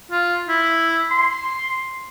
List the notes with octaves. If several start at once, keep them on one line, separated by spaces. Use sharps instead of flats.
F4
E4
C6